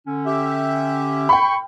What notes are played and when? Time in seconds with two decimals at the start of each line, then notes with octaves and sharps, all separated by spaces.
0.07 D3 C#4
0.26 G4 E5
1.29 G5 B5 C#6